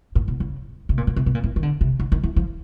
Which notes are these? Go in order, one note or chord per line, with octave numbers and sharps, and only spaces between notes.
A2
B2
C#3
C3
A#2
B2
C3
B2
A#2
A2
D#3
D3
C3
D3
D#3
E3
F3